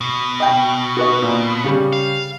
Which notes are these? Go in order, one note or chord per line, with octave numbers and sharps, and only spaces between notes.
B2
D#5 G5
F#4 B4 D#5
A#2
C#3 G3
F5